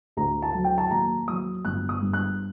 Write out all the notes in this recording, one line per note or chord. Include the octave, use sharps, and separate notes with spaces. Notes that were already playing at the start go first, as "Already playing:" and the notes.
D2 A#5
A5
F#3
G5
A5
D#2 A#5
F#3 D#6
G1 F#6
D#6
G2
F#6